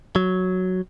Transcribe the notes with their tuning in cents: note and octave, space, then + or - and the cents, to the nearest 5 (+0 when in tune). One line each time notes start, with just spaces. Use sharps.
F#3 +0